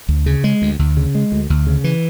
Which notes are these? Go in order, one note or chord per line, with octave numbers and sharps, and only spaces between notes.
D2
C#3
G#3
D2
D2
C#3
G#3
D2
D2
C#3
E3